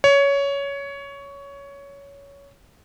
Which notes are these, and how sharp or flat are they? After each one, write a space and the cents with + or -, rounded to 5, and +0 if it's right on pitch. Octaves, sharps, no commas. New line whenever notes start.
C#5 +15